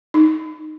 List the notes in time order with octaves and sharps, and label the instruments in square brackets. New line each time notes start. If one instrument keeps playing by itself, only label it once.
[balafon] D#4